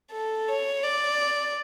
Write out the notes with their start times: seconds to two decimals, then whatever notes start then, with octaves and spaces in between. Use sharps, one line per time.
0.12 A4
0.48 C#5
0.83 D5